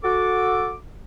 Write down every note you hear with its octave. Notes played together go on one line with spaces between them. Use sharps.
F#4 A4 D6